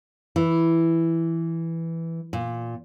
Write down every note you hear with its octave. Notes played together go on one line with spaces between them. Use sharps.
E3
A#2